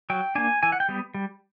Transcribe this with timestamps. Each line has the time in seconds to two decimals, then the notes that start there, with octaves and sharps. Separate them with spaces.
0.10 F#3 G5
0.35 A#3 D4 G#5
0.63 E3 G#5
0.72 F#5
0.80 G5
0.89 G3 B3
1.14 G3